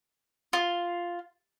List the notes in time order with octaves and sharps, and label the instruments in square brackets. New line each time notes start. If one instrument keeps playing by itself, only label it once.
[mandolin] F4